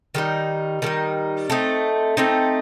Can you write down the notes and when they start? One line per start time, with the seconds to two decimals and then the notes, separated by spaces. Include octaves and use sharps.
0.15 D#3 G3 D#4
0.82 D#3 G3 D#4
1.50 A3 C4 D#4
2.17 A3 C4 D#4